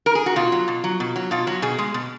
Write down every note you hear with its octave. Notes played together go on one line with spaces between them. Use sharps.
A#4
G#4
F#4
B2 F4
F#3
B2
F#3
B2
F#3
B2 F4
F#3 F#4
B2 G#4
G#3
B2